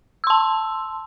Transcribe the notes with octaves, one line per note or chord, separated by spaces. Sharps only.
A5 C6 E6